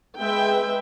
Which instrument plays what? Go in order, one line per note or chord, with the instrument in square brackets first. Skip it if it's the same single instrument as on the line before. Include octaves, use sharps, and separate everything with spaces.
[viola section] G#3 B4 E5 G5